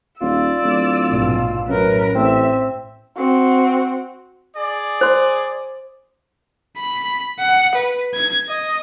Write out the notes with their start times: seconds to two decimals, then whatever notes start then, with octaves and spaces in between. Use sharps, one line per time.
0.21 D#1 F4 D5 E6
0.63 D1
1.11 A#1 G#2 B2
1.68 F#2 A2 A#4 B4
2.15 A1 C4 E5
3.16 C4 F#4
4.56 G#4 D5
5.01 C5 C6
6.77 B5
7.39 F#5
7.75 B4
8.15 G#6
8.48 D#5